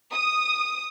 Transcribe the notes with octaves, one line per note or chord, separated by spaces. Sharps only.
D#6